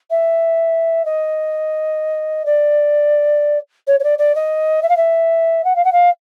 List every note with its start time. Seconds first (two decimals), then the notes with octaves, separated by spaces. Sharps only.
0.10 E5
1.05 D#5
2.45 D5
3.87 C#5
3.99 C#5
4.03 D5
4.18 D5
4.35 D#5
4.82 E5
4.89 F5
4.96 E5
5.64 F#5
5.75 F5
5.84 F#5
5.92 F5